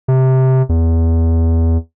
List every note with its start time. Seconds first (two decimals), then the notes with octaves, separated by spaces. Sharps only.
0.08 C3
0.69 E2